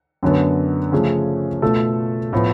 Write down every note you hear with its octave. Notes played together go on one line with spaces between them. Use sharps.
F#2 D3 F#3 B3
C#3 F3 A3 C#4 G#4
B2 A3 F4 A4
A2 F3 B3